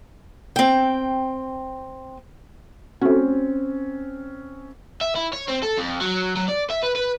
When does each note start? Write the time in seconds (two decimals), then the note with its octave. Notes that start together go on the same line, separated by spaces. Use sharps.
0.56 C4 G5
3.01 A3 C4 C#4 F#4
5.01 E5
5.16 E4
5.33 C#5
5.48 C4
5.63 A4
5.78 F2
6.02 F#3
6.37 F#3
6.49 D5
6.71 E5
6.83 B4
6.96 B4